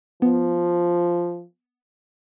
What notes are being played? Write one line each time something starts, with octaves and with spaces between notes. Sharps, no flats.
F3 B3